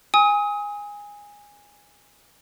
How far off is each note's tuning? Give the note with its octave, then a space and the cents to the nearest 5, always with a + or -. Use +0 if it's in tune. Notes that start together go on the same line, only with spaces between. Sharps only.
G#5 -15 D#6 +35